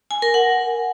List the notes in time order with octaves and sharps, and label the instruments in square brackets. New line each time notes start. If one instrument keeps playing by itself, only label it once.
[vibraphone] G#5
A#4
F#5